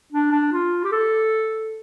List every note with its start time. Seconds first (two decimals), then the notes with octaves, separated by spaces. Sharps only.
0.13 D4
0.32 D4
0.53 F4
0.84 G4
0.92 A4